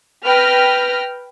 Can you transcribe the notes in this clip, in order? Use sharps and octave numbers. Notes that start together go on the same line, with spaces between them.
B4 G5 F6 A#6